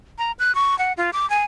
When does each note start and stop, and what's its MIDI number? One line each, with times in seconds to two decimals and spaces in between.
0.18 0.32 82
0.39 0.54 90
0.55 0.78 85
0.79 0.93 78
0.97 1.11 65
1.13 1.28 86
1.30 1.45 80